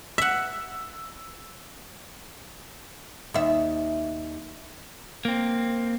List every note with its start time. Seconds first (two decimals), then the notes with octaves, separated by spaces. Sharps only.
0.18 E5 F#5 E6
3.34 D#2 E5
5.25 A#3 C4